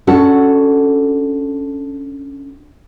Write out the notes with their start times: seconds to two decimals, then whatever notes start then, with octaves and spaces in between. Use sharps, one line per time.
0.07 C#4 D4 F#4 A4